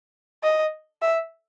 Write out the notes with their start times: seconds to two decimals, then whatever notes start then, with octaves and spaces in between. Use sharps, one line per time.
0.43 D#5
1.02 E5